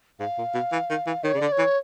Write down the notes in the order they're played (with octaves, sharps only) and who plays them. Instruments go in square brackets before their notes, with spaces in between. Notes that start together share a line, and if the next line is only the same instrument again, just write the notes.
[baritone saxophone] G#2 [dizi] F5
[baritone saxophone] A#2
B2
E3
D#3
E3
[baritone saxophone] D#3 [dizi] C#5
[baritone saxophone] C#3
[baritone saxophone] D3 [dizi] D5
[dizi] C#5
[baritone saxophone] E3